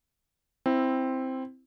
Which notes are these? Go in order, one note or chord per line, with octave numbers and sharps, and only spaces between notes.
C4 E4